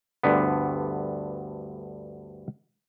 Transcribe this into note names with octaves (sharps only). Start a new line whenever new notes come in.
D2 G2 D3 B3